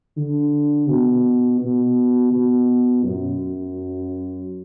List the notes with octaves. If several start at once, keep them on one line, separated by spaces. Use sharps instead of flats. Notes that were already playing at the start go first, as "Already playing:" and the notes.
D3
B2
B2
B2
F#2